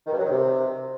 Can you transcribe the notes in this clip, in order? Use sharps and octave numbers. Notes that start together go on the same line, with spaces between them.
D#3
G2
F#3
D#3
C3